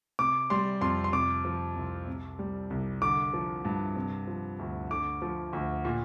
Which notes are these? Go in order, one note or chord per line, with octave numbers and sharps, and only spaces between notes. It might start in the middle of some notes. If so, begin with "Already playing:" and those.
C3 D6
G3 C6
F2 C6
C6
C3 D6
F3
C2
C3
G3
C2
D3 D6
F3
G2
C3
F3
D2
D3 D6
F3
D2
A#2